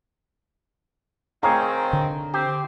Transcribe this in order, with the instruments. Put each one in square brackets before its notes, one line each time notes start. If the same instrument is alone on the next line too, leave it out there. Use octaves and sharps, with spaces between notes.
[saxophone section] D#3 C4 [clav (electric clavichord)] G#4 C#5 F5 [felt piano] A#5
[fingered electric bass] D3
[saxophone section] C4 [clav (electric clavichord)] G4